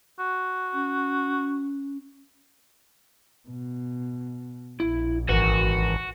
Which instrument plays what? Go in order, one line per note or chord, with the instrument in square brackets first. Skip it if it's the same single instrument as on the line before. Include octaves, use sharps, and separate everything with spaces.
[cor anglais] F#4
[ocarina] C#4
[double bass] B2
[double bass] A#1 [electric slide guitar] E4
[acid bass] G#1 [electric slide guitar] E3 A#4 B4 [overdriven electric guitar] F#4